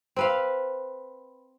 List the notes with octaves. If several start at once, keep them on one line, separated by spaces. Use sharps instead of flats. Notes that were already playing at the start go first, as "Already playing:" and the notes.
C4 B4 F5